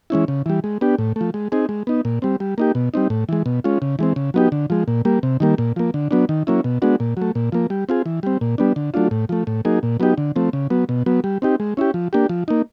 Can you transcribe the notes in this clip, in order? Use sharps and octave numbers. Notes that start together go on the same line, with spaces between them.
E3 G#3 C#4 E4
C#3
E3 G3
G#3
B3 D4 G4
A2
F3 A3
G#3
C4 D#4 G#4
G#3
B3 D#4
A#2
G3 C4
G3
A#3 D#4 G4
B2
G3 C4 D#4
A2
E3 G#3
B2
G#3 C#4 F4
C#3
E3 G#3 C4
C#3
F#3 B3 D#4 G4
D3
F3 G#3
A#2
G3 A#3
C3
D#3 G3 A#3
A#2
F3 A#3
D3
F#3 B3 D4
D#3
F#3 A#3 C#4 E4
B2
G#3 B3 D4 F#4
A#2
F#3 A3
A#2
F3 A#3
G3
C4 F4 G#4
E3
G3 C4
A#2
G3 B3 D4
D3
F#3 A3 D4 F4
A2
F3 A3
A2
F#3 A#3 D#4 G#4
A#2
F#3 B3 D#4 G4
D3
F3 A3 C4
C#3
F#3 B3
B2
F#3 B3
G3
C4 D#4 G4
G#3
C#4 E4 G4
F3
A#3 D4 G4
F3
A#3 D#4